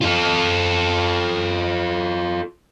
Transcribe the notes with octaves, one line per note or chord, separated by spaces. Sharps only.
F4 A4